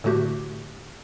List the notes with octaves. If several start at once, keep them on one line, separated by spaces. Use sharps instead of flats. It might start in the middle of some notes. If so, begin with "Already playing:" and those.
A2 D3 A3 F#4 G4